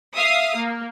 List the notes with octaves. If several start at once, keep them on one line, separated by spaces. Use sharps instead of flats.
E5 F5 D#6
A#3